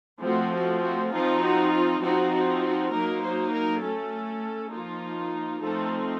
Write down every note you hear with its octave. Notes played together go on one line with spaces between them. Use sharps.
F3 A3 C4 F#4
F#4
F#4
F3 C4 D#4 F4
F#4
F4
F3 C4 D#4 F#4
F#4
F#4
F#3 A#3 D#4 A#4
C5
A#4
A3 C#4 A4
F3 A#3 D#4 F4
F3 A3 C4 D#4 A4